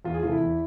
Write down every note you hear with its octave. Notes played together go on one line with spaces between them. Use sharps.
E2 F4
G#4
C3 E3 A3 F4
E4
E2